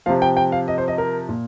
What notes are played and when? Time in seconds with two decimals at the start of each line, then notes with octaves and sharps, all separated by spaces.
0.06 C3 F3 F5
0.22 G5
0.37 G5
0.52 F5
0.68 D#5
0.78 C5
0.88 D#5
0.98 A#4
1.29 A#2